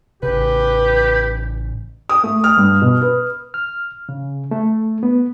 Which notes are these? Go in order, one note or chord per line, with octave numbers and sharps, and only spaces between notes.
A1 C#3 G4 B4
D#6
A3
F6
G2
B2
B4
F6
C#3
A3
B3